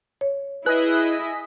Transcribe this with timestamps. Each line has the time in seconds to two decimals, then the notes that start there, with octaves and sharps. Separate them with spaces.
0.21 C#5
0.66 E4 G#4 B4 D#5 F#6 B6